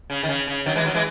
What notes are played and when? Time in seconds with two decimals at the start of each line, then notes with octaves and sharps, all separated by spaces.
0.10 C#3
0.23 D#3
0.28 C#3
0.47 C#3
0.66 D#3 F#3
0.75 E3 G#3
0.85 D#3 F#3
0.94 E3 G#3